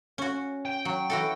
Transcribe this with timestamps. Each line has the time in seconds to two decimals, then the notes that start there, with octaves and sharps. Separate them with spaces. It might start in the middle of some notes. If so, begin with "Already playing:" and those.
0.18 C#4 F#4
0.65 G5
0.85 F#3
1.10 E3 F#4 A4